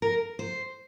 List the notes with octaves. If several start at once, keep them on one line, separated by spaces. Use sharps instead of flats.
A#4
C5